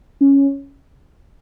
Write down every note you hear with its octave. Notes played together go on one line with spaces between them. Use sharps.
C#4